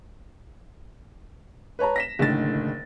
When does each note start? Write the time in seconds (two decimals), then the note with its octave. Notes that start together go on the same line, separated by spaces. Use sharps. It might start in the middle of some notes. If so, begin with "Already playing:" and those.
1.79 B4 C#5 A5 A#5
1.96 A#6 B6 E7
2.19 F#1 A2 D3 D#3 A6